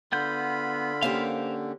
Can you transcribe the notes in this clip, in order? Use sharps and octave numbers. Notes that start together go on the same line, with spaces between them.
D3 B3 F4 F#5 B5 G6
A#3 C#4 G4 A#4 C5 F5